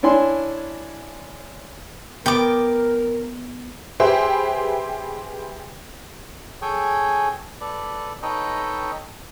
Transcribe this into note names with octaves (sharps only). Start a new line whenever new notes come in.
C#4 D4 E4 G#5 C6
B3 A#4 G5 D6 A6
G4 G#4 B4 C5 E5 G5
G#4 A4 C#5 G5 G#5
A4 B4 D5
D#4 A4 B4 C#5 D#5 G5